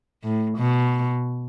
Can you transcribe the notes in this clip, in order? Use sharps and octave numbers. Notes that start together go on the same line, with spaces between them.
A2
B2